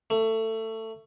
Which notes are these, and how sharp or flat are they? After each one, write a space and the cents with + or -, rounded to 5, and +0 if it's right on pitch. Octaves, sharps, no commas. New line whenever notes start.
A3 +20